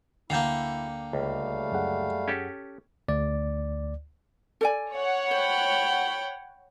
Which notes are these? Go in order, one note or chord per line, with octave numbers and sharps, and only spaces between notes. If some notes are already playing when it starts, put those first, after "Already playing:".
D2 D3 A#3 E4 F5 G5 A5 G6
C#2 G3 A3 F5
F#2 G#4 F#5
C#4 G4 A4
D2 D5
A4 D5 G#5
C#5 F#5
C5 G5 B5